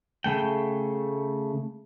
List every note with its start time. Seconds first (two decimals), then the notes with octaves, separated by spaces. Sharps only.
0.24 C#3 A3 G5